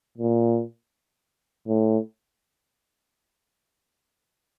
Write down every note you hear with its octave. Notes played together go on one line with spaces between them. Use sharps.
A#2
A2